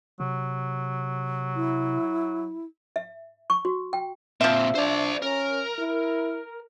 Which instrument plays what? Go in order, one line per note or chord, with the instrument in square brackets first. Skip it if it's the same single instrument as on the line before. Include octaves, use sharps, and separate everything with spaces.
[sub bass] C3 [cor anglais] F#3
[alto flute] E4
[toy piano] E5
C#6
F#4
G5
[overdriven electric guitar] A#2 C4 [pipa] F3 E5
[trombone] D4 [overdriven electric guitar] C5 D5
[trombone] C#4 [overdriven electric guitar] A#4
[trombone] E4